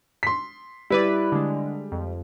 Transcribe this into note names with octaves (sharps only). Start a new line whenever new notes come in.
C6 B6
G3 E4 B4 D5
D3 G#3
F2